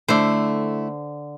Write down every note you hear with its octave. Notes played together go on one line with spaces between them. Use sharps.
D3 A3 E4 C5